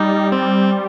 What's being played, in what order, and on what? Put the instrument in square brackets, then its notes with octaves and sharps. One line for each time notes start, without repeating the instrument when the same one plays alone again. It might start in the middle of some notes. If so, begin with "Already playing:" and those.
Already playing: [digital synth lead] G3 [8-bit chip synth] D#4
[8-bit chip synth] C4